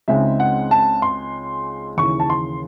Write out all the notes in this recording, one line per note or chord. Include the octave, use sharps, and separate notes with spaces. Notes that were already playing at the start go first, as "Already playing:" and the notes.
C#2 C#3 G#3 C4 D#4 E5
F#5
A5
C6
D#2 C#3 E3 C#6
A5
C6